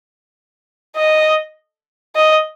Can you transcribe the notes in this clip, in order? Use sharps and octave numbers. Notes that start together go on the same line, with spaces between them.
D#5
D#5